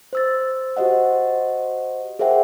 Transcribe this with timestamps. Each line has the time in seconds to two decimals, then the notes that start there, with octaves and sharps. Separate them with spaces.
0.13 C5 E6 A6
0.77 F#4 G4 C5 D#5 F#5
2.19 G#4 A#4 C5 E5 F#5 G5